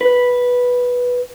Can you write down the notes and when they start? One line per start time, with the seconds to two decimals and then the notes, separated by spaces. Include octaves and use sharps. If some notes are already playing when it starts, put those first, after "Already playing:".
0.01 B4